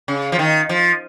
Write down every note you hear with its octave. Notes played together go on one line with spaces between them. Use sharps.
C#3
F3
D#3
F3